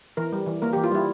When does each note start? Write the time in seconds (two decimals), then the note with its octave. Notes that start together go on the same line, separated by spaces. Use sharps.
0.17 E3 A#4
0.32 G3
0.46 E3
0.62 A#3 A#4
0.73 G4
0.76 E3
0.84 F4
0.91 G3 E4